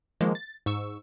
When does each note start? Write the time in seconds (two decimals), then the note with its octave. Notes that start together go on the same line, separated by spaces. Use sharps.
0.21 D#3 F3 G#3 A#3
0.35 A6
0.66 G#2 C#6 E6